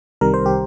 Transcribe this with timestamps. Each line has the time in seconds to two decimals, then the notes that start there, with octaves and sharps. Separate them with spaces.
0.21 C2 C3 D#3 G3 A#4
0.34 C5
0.46 G4